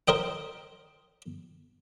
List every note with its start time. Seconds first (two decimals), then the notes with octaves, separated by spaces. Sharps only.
0.08 A#4 C5 D#5 G5